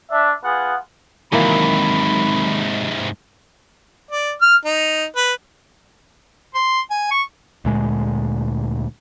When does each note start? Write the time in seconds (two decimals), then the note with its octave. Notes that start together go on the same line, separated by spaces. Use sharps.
0.10 D4 E5
0.43 B3 F4 G#4 F#5
1.32 G#2 C3 D#3 E3 F#3 A#3 B5
4.11 D5
4.41 F6
4.65 D#4
5.16 B4
6.55 C6
6.91 G#5
7.11 C#6
7.65 D2 A#2 G#3